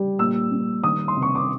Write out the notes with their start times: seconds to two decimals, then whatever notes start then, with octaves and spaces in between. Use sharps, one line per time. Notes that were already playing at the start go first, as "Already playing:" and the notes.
Already playing: G3
0.19 A#2 E6
0.52 G3
0.84 D#3 D#6
1.08 C6
1.16 C3
1.22 C#6
1.35 D6